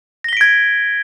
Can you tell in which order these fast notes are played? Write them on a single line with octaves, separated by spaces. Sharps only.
A#6 G7 B6 D7 G#6